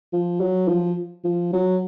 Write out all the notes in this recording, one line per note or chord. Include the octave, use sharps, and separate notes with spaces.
F3
F#3
F3
F3
F#3